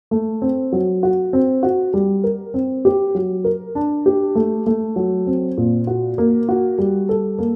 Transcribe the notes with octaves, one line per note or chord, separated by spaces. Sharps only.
A3
C4
F#3
F#4
C4
F#4
G3
A#4
C4
G4
F#3
A#4
D4
G4
A3
A3
F#3
C4
A#2
F#4
A#3
F#4
G3
A4
A#3